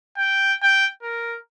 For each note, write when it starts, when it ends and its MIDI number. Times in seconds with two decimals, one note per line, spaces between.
0.18 0.55 79
0.62 0.87 79
1.02 1.37 70